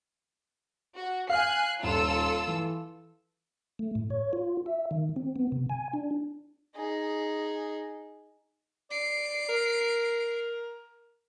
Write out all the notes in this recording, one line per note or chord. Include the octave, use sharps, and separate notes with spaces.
F#4
F5 G#5 F6 F#6 C7
D#1 F4 A4 E6
E3
A3
A2
C#5
F4
E5
D#3
C4
B3
C3
G#5
D4
D#4 G#4
D5 C7 D7
A#4